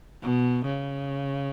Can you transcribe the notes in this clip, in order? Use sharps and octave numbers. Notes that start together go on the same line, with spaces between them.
B2
C#3